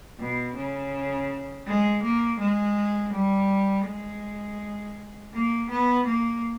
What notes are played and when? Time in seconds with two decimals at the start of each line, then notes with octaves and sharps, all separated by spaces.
0.19 B2
0.56 C#3
1.67 G#3
2.03 A#3
2.40 G#3
3.13 G3
3.86 G#3
5.33 A#3
5.70 B3
6.07 A#3